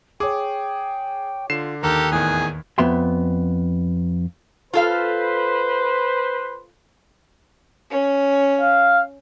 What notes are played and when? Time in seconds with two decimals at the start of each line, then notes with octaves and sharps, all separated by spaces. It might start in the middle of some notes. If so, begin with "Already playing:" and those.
0.20 G#4 C#5 G5 D6
1.50 D3 F4 C7 E7
1.83 D#2 G4 A4 A#4 F#6
2.12 E2 A2 D#3 G#4
2.78 F2 B3 E5 C6
4.74 F4 A4 B4 C5 F5
7.89 C#4
8.61 F5